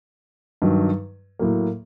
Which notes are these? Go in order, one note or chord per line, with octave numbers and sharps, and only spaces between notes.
G2 D#3 F#3
A2 F#3 A#3